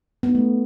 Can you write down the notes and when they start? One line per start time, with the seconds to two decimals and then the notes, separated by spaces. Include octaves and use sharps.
0.23 B3
0.29 D#4
0.35 A3